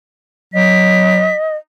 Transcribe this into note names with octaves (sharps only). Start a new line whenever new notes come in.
F#3 D#5 B6